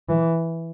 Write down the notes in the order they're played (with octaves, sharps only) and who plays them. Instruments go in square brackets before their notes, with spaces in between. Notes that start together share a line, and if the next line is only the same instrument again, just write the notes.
[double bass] E3